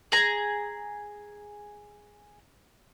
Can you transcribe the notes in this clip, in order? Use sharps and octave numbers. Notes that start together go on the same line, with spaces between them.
G#4 A#5